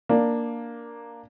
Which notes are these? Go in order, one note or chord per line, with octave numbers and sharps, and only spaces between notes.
A#3 D4